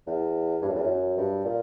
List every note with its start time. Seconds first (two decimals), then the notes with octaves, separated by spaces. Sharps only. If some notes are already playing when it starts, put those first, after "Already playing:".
0.07 E2
0.62 G2
0.69 F#2
0.75 E2
0.83 F#2
1.17 G2
1.45 A#2